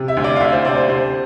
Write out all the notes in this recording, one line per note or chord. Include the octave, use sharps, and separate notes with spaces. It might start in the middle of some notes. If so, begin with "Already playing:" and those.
Already playing: C3
E5
D2
D5
F5
D2 E5
C5
C3 D5
C5
C3 C5